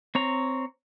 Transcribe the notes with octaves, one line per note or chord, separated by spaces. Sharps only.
C4 C#5 A#5